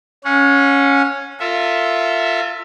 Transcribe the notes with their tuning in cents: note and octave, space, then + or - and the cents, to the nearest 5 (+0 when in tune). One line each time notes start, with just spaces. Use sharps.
C#4 +0 F#5 -45
F4 +0 A4 +40 E5 +0